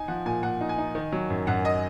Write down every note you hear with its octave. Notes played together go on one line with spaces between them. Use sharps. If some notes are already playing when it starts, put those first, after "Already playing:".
Already playing: D#4 G#5
F3 F#5
A#2 G#5
A#2 F#5
D#4
G#5
D#4
D#3
F#3
F#2
F#2 F#5
D#5